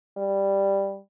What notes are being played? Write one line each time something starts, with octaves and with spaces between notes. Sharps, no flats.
G3